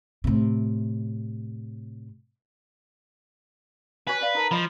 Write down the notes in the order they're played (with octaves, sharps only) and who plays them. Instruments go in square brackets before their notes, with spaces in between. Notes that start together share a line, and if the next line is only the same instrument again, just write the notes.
[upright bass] A2 C3
[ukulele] F#4 C#5 G#5 [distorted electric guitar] B4
[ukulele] D5 F5
D#4 A#4 A5
[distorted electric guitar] F3 [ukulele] D#5 B5